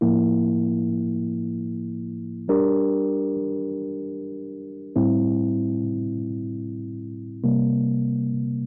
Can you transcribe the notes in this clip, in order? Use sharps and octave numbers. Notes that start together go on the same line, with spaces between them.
A2 F3 A#3 E4
G3 D4 G4 A#4
A2 G3 C4 E4
C3 G3 A#3